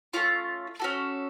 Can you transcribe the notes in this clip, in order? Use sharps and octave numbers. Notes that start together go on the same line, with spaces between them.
A3 C#4 F4
C#4 F#4 A4